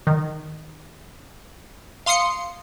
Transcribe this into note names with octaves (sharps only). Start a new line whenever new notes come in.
D#3
F5 C6 D#6 C7 C#7